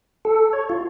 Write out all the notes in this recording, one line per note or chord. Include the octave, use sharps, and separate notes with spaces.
A4
C#5
F4